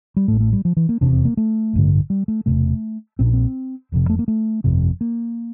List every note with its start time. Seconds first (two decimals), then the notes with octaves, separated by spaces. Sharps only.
0.16 G3
0.28 A2 A3
0.32 A1
0.40 A3
0.53 G3
0.65 F3
0.77 E3
0.89 A#3
1.01 F1 E2 C3 D4
1.13 C4
1.25 A#3
1.37 A3
1.73 A1 G2 D3
2.10 G3
2.28 A3
2.46 E1 E2 C3 A3
3.19 A#1 A#2 C4
3.26 D4
3.33 C4
3.92 F1 F2 C3
4.10 A3
4.19 A#3
4.28 A3
4.64 G1 F2 C3
5.01 A#3